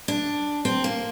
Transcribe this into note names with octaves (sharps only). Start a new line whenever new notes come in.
D4
C4
A#3